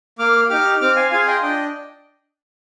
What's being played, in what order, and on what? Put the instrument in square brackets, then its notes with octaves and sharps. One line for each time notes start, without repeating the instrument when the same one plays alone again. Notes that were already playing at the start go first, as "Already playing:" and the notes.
[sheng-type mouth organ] A#3 D6 F6
D#4 G4 D6 F6
C4 D6 F6
F5 G#5
F4 G#4 F5 G#5
G#5
D#5 G5
D4 D#5 G5